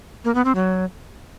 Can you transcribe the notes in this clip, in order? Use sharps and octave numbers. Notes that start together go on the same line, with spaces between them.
A#3
B3
C4
F#3